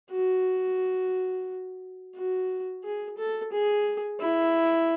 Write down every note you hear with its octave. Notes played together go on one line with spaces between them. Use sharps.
F#4
F#4
G#4
A4
G#4
E4